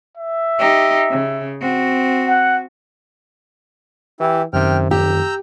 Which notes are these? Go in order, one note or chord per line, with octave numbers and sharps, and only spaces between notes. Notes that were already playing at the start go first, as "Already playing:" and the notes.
E5
D#4 G4
C#3
C4 F#4
F#5
E3 E4 G4
F#2 C3 D#3 G5 F6
F1 G4 A#5 E6 G6